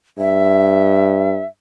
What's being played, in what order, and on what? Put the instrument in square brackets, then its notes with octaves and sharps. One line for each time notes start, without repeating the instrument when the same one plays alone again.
[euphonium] G2 [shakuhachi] E5